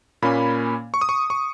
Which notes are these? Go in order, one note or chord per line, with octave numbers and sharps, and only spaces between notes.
A#2 A#3 C#4 B5
C#6
D#6
C#6
C#6